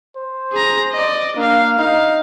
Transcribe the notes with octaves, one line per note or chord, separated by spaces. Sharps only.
C5
G#4 A#5
D5 D#5
A#3 D4 F5
D#4 F5